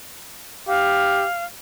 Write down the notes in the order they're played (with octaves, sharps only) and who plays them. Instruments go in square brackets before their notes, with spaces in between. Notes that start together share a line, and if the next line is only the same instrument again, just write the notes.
[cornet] G4 [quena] F5